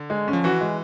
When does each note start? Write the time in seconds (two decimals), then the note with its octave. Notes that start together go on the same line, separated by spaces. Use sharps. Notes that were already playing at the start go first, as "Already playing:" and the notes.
Already playing: D3
0.10 G#3
0.28 C#4
0.33 F3
0.44 E3 F#4
0.61 G#3